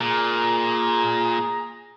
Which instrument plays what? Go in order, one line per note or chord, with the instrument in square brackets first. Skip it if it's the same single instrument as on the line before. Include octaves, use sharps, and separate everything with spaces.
[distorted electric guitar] A#2 [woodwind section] G#4 A#5